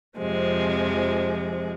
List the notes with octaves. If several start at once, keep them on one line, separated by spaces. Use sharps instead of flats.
F2 C3 F3 G#3